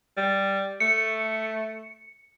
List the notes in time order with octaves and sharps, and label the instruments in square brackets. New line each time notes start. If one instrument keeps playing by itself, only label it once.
[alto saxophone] G3
[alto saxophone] A3 [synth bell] C#7